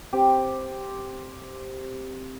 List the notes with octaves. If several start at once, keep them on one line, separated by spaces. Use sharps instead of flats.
C4 G4